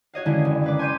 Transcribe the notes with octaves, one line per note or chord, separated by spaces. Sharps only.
F#4 C#5 D#5 F5
D3 D#3 G#3 C#4 E4
F#1
G#3 B4 D6
G#5 C6 C#6 G6 B6 D#7